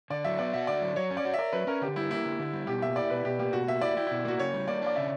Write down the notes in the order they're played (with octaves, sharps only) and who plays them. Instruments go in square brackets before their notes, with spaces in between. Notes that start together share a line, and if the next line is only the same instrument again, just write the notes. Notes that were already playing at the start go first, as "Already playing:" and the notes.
[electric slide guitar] D3 [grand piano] D5
[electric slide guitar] F#3 [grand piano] E5
[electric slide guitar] B3 [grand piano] D5
[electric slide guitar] F#4 [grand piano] E5
[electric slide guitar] D3 [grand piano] D5
[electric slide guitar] F#3
[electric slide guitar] F#3 [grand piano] C#5
[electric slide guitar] C#4
[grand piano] D5
[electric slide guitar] F#4
[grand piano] E5
[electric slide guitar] A#4 [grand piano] D5
[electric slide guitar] F#3 [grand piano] B4
[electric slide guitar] C#4 [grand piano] A#4
[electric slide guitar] D3 [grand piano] G4
[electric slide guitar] G3 [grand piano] E4
[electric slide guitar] A#3 [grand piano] E4
[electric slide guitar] D3
D3
G3
[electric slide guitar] B2 [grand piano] G4
[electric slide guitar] A#3 [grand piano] E5
[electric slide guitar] E4 [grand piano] D5
[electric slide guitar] B2 [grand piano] B4
[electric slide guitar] B2 [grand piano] G4
[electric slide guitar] A#3 [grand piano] G4
[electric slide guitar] B2 [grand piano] F#4
[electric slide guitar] A#3 [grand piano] E5
[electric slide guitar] E4 [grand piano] D5
[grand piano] E4 [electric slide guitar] G4
[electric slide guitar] B2 [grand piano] E4
[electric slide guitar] A#3 [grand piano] F#4
[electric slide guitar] C#3 [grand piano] C#5
[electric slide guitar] G3
[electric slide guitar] A#3 [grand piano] D5
[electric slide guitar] D4 [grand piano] D5
[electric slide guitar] C#3 [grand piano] E5